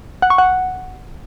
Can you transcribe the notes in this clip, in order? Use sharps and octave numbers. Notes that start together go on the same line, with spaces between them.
F#5
C#6
F#5